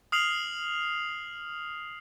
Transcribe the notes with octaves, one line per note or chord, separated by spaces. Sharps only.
D#6 F6 C7 F7 F#7